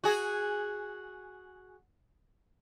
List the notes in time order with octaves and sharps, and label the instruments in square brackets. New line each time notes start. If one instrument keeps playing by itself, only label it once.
[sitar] F#4 G#4